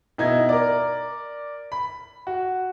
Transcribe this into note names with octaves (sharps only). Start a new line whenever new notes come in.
B2 D#4 E4 G#6
A#4 D5
B5
F#4